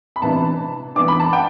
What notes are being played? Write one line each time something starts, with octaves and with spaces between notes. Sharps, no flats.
B5
C3 E3 B3 D4 A5
E3 B3 D4 D6
B5
A5
G5